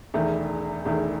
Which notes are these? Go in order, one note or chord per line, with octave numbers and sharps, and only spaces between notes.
E1 E2 D#3 A3
E1 E2 D#3 A3